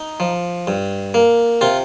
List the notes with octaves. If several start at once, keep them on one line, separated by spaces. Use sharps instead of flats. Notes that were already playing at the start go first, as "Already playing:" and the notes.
Already playing: D#4
F3
G2
A#3
C3 F4